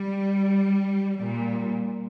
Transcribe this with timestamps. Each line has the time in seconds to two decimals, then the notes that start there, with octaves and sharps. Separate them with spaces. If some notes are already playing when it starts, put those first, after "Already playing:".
Already playing: G3
1.18 A#2 G3